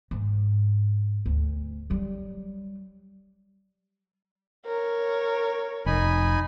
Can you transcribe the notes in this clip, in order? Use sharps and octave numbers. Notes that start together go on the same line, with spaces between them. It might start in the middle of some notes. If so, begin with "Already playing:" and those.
G#2
D2
F#3 G3
A#4 C#5
F1 D#4 G#5 B5